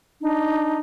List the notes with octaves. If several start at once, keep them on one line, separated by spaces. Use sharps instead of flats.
D4 D#4